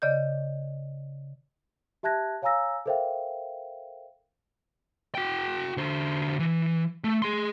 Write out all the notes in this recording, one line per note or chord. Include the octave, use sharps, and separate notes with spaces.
C#3 D5 D#5 G6
G4 E5 A5 F#6 G#6 A#6
C#5 F5 G#5 A#5 E6 A#6
A4 A#4 C5 E5 F5 G5
F#4 G5
D3 C5
E3
A3
G#4 C6